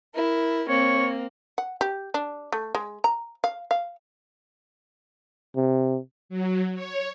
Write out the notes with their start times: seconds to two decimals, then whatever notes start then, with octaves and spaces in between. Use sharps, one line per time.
0.15 E4 A#4
0.69 A#3 C4 C#5
1.58 F#5
1.81 G4
2.14 D4
2.52 A3
2.75 G#3
3.04 A#5
3.44 F5
3.71 F5
5.56 C3
6.29 F#3
6.75 C#5